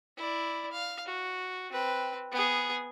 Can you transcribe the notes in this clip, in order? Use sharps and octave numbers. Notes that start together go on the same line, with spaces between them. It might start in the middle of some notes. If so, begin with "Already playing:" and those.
E4 D5
F5
F#4
C4 B4
B3 G#4